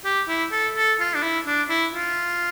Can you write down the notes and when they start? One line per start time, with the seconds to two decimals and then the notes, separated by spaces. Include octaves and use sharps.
0.05 G4
0.28 E4
0.52 A4
0.76 A4
1.00 F4
1.15 D4
1.23 E4
1.47 D4
1.69 E4
1.94 F4